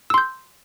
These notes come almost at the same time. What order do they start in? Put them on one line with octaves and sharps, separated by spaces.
E6 C6 G6